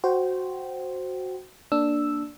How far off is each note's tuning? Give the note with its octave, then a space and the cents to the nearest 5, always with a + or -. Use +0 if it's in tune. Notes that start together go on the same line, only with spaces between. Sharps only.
F#4 +0 C5 +0 G5 -20
A#3 +0 D4 +0 E6 +0